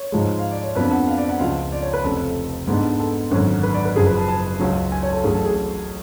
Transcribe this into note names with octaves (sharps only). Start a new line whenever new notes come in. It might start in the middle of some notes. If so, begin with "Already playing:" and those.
Already playing: C#5
G#2 F3 G#3
F5
D5
C#5
F2 F3 B3 D4 B4
F#5
F5
D5
F#5
C#2 C#3 F3 F5
D5
C#5
B4
F1 F2 C#3 A4
G#2 G#3 B3 D4
A4
G#1 F#2 D3 F#3 C#4
B4
D5
B4
F#1 F#2 F3 G#4
B4
A5
A5
C#2 C#3 F#3 C#4
G#5
C#5
A4
A1 A2 F#3 C#4 G#4
A4
G#4
A4